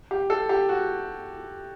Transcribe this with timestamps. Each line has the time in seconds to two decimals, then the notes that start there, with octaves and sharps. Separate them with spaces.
0.11 G4
0.30 A4
0.49 G4
0.69 F#4